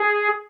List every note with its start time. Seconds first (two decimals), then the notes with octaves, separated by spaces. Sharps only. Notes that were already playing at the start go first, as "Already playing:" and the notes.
Already playing: G#4